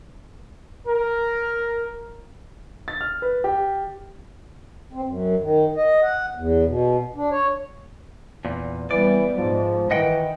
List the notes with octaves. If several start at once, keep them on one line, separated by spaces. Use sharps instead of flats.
A#4
A6
F6
B4
G4
C4
F#2
D#3
D#5
F#5
E2
B2
D4
C#5
E2 A#2
E3 G3 B3 D5
G#2 F3
D#3 E3 D#5 F#5 G5